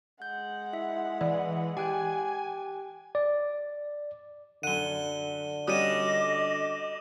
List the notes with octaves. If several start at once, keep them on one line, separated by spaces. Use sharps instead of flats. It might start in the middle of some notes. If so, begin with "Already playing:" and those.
G#3 F#5 G6
E4 E5
E3 D5
G4 G5 G#5 F#6
D5
F#2 D3 F#5 D#7 G7
G3 C#4 F#4 D#5 D6 D#6 D#7 E7